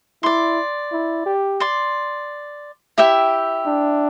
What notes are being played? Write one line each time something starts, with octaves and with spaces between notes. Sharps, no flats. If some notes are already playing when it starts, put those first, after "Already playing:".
E4 D5 C6
E4
G4
D5 C6
E4 G4 E5 G5
D4